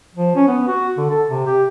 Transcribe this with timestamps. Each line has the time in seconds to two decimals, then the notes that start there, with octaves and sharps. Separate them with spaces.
0.15 F3
0.36 C#4
0.48 B3
0.67 F#4
0.97 D3
1.10 A4
1.28 C3
1.46 G4